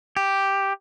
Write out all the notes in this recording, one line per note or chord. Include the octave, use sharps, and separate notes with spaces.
G4